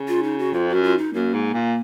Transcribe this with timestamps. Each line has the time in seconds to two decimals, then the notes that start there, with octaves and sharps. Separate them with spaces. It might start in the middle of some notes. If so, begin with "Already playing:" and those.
Already playing: C#3
0.08 F4
0.23 D#4
0.38 F#4
0.53 F2 F4
0.68 F#4
0.73 F#2
0.83 F4
0.98 D#4
1.13 F#2 A#3
1.34 G#2
1.53 A#2